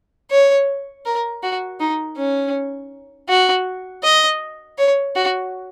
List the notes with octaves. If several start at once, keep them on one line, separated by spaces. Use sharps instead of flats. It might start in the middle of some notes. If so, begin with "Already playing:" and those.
C#5
A#4
F#4
D#4
C#4
F#4
D#5
C#5
F#4